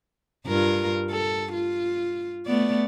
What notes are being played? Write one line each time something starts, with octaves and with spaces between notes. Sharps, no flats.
G2 F4 A#4
A4
F4
A3 B3 D5